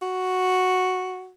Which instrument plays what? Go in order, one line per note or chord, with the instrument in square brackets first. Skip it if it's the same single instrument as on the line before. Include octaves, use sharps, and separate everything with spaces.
[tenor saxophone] F#4